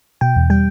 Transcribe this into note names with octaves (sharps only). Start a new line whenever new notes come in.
B2 G5
E2
G3 G5